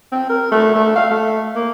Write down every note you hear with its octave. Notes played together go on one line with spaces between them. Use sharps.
C4
A#4
A3
A3
F5
A3
A#3